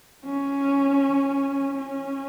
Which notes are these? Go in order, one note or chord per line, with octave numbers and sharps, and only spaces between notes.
C#4
C#4